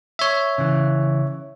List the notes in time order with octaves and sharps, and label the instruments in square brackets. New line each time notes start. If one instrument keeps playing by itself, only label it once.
[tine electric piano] C#5 E5
[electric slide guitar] C#3 E3